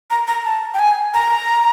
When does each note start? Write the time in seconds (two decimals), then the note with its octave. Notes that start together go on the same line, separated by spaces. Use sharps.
0.11 A#5
0.28 A#5
0.45 A5
0.74 G5
0.79 G#5
1.14 A#5